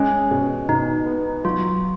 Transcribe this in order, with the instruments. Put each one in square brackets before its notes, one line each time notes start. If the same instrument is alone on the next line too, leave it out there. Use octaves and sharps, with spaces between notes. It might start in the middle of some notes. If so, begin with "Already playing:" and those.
Already playing: [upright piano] G#3 [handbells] C#4
[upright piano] B2
[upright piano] B2 [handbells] D#4
[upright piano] B3
[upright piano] F#3 [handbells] F4